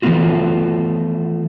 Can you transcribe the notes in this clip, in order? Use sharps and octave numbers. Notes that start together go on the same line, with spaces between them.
E3 F3 A3 B3 F4 F#4